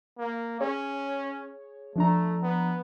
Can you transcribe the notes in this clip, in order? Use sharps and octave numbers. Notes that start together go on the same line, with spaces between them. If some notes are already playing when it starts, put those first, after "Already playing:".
A#3
C#4 G#4 C#5
F3 A3 D4 A#5
B3